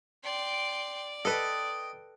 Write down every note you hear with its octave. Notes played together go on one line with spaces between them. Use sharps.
D5 G5 C6
A4 B4 D#5 G5